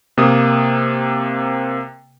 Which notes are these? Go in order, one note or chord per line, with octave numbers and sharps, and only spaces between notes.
C3 A#3 D#6